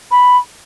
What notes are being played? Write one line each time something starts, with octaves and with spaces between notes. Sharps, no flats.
B5